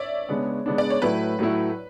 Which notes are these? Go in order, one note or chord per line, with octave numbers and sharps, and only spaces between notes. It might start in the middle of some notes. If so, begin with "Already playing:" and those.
Already playing: C#5 D5 E5
C#3 G#3 B3 D4
C#3 G#3 B3 D4
D5
C#5
A2 F#3 A3 E4 B4
A2 F#3 A3 E4